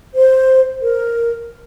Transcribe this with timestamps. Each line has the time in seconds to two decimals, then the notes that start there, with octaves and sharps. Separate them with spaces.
0.15 C5
0.81 A#4